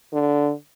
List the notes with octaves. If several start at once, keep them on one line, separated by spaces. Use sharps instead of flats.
D3